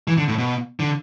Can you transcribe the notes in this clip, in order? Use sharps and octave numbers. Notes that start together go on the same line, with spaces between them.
E3
D3
A2
B2
D3